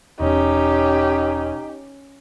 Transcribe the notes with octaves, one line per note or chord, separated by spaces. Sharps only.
E1 C#4 D#4 G4